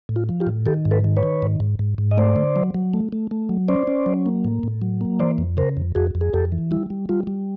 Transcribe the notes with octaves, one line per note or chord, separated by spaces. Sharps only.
A2
F4
F3
F4 G4
A2
D#3 G4 A4
G#2
A4 B4
D#3
B4 C#5
D#3
G#2
G#2
G#2
G#2
D#5
A3 C5 D5
D3
F#3
F#3
A3
A3
A3
F#3
C#4 C5 D5
C#4
F#3
A#3
A2
A2
F#3
A#3
E3 C5 D5
F2
C#3 A#4 C5
F2
F2 F#4 G#4
F2
G#4
F2 G4 A4
E3
G3 E4
G3
G3 F4
G3